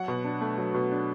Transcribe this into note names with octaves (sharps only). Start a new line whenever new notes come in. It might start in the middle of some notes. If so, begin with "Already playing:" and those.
Already playing: F#3 F#5
B2
D4
A3
F#3
B2
D4